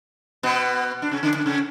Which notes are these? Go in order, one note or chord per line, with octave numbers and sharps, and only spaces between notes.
B2 B3
D4
C#3 C#4
D3 D4
D3 D4
C#3 C#4